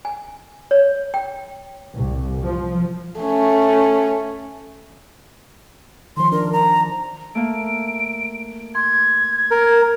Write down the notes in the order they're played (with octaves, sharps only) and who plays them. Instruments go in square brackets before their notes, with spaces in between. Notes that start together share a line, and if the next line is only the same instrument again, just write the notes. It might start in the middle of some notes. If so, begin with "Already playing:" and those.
[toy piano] G#5
C#5
G5
[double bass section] C2
F3
[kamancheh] A3 C#4
[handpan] D#3 F3 [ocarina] C6
[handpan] D4 [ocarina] A#4
[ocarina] A#5
[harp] A3 A#3 [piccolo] D7
[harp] C6 [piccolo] G#6
[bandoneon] A#4